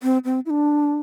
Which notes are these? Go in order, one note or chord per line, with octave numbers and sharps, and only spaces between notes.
C4
C4
E4
D4